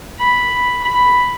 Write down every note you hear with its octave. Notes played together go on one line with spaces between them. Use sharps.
B5
B5